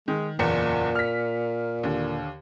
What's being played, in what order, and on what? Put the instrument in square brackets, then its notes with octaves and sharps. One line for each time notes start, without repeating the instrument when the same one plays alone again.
[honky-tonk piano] D#3 [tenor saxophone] G#3
[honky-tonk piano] F#1 E2 C#7 [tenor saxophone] A#2
[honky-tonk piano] F6 B6
D#2 D3